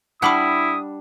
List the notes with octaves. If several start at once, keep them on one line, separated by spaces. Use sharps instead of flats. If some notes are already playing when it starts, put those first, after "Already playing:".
G3 D4 E4 F#5 B5 D6 D#6